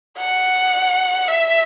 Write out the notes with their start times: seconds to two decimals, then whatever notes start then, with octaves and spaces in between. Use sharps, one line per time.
0.18 F#5
1.28 E5